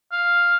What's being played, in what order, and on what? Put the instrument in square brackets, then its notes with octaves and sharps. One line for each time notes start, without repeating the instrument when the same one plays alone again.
[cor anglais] F5